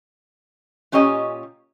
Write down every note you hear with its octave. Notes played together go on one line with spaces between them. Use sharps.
A#2 C#4 G4 C#5 D#5 G#5